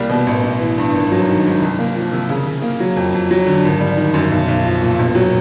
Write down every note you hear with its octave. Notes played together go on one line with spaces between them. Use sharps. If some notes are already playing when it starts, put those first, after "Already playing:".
Already playing: C2 G3 A#3
B2
A1
A1
E3
G2
G#1
F#3
D#3
G#2
C2
A#3
F3
C3
C#3
C#3
A#3
F#3
F2
F2
F#3
D3
G#1
G3
D#3
F#2
B1
B1
F3
A#2
E1
F#3